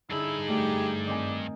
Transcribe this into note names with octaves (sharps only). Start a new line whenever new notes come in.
G2 D3 D#4 E4 G#4 B5
D3 A3 G4
D#3 C4 D5 G#5